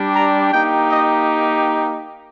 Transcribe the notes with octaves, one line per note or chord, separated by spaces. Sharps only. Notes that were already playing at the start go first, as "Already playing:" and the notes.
Already playing: G3 D4 G4
A#5
A#3 D#4 G4 G5
D#5